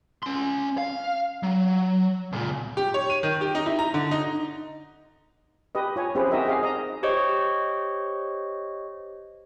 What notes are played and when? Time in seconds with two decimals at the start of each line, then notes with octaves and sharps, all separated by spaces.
0.23 C#4 C6
0.78 F5
1.43 F#3
2.33 C#2 A#2
2.77 G4
2.94 C#5
3.10 D#7
3.23 D#3
3.41 G4
3.55 D#4
3.66 E4
3.79 A#5
3.94 D3
4.11 D#4
5.75 G4 B4 D#5
5.96 F4 C#5 G#5
6.15 C4 C#4 G4 G#4 B4 C5
6.31 D#4 F#4 G4 A#4 D#5 E5
6.45 G4 G#4 F5
6.63 D#5 A#5
7.03 G4 C5 C#5 D#5 C#6